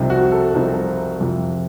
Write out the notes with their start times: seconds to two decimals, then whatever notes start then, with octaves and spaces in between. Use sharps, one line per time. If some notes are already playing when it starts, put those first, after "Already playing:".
Already playing: C2 C3 F3 C4 D#4
0.10 F#4
0.32 A4
0.54 C2 C3 F3 C4 D#4
1.20 F2 C3 F3